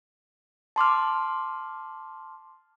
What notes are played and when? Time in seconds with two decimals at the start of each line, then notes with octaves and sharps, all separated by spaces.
0.76 A5 C6 D6 F6